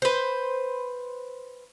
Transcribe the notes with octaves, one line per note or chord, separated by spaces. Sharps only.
B4 C5